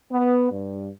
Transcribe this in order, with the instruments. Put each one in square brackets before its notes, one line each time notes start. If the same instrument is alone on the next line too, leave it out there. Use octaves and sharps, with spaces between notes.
[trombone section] B3
G2